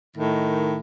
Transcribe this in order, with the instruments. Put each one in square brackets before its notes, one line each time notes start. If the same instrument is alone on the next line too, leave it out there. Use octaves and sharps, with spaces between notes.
[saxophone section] A2 D#3